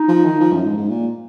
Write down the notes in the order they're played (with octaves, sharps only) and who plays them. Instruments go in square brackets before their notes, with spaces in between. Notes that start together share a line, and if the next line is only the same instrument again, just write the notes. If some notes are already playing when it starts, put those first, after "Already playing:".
Already playing: [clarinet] D#4
[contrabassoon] F3
D#3
F3
F#2
G#2
G#2
A#2